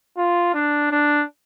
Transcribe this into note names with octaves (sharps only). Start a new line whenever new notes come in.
F4
D4
D4